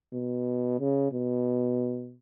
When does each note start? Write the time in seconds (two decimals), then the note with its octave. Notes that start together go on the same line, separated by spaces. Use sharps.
0.13 B2
0.79 C#3
1.12 B2